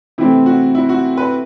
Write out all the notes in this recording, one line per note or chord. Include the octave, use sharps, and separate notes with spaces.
C3 E3 A3 C4 E4
F#4
E4
F#4
B4